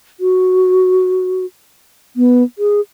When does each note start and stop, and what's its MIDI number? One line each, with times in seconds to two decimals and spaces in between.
0.20 1.45 66
2.16 2.43 59
2.58 2.81 68